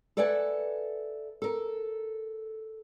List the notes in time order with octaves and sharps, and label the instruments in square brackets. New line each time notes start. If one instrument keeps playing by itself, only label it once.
[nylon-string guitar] A4 B4 D5 E5 F#5 G#5
A4 A#4